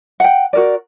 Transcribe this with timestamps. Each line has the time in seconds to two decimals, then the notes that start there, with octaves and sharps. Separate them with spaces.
0.20 F#5 G5
0.53 F#4 A#4 D5